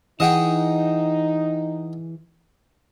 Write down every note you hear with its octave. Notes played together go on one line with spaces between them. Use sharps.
E3 D#4 G#4 D#5 F#5 G5